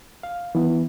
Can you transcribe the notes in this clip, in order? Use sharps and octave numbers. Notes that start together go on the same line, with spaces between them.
F5
E3 B3